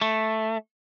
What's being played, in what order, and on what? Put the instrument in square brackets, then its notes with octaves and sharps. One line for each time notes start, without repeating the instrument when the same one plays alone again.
[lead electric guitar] A3